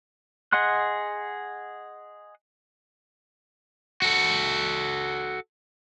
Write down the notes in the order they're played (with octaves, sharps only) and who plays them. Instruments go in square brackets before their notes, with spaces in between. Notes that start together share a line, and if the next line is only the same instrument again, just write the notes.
[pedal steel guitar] G#4 D#5 F#5 C6 F#6
[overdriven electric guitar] F#4 A4